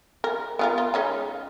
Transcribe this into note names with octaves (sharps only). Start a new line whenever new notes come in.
A#4
B3 F4 A#4
F4
G#3 C#4 D#4